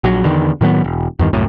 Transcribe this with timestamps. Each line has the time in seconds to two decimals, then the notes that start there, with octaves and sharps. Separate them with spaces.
0.04 A#1 F#3
0.24 E2 D3 D#3
0.61 A2 D#3 F#3 B3
0.84 E1
1.19 E2 G2 D#3
1.33 C2 F#2 A2